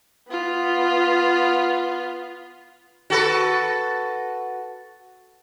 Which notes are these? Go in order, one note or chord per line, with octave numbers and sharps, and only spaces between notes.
B3 F4
F#4 A4 B4